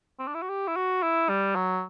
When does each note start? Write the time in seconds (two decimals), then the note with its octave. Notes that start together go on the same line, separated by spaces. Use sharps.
0.19 C4
0.28 D4
0.34 E4
0.43 F#4
0.49 G4
0.68 E4
0.76 F#4
1.03 E4
1.29 G3
1.55 F#3